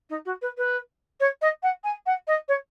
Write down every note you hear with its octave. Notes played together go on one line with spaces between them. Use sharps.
D#4
F#4
B4
B4
C#5
D#5
F#5
G#5
F#5
D#5
C#5